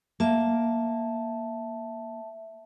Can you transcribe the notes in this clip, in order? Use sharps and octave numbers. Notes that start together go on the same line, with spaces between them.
A#3 E5 A5